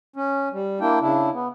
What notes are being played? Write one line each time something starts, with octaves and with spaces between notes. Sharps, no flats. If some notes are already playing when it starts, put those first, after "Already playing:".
C#4
G3
A#3 D4 E4 G5
C#3 D4 E4
B3